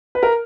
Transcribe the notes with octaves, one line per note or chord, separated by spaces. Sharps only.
B4
A#4